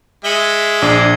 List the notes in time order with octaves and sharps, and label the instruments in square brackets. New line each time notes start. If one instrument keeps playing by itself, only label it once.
[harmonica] G#3 E5 [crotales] C#7 F#7 G7
[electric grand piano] A#1 [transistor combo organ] D4 [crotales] G#6 C7 D#7